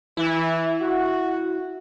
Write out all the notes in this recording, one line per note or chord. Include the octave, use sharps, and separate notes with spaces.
E3 E4
F#4